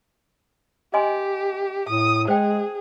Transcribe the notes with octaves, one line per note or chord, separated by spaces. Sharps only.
G4 D#5 G#5 C6
A2 D#6
G#3 G#4 C5 G5